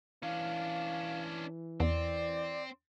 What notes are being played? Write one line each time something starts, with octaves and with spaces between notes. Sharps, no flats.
E3 C#4 D4 F5
E2 C4 D5